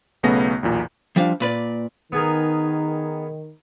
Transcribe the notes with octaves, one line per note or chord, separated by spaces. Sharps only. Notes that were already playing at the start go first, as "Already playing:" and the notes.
B1 C#3 A3 B3 C#4 A#6
B1 E2 A#2
F3 G3 D4 F5
A#2 B4 D5
D#3 B3 G#4 A#4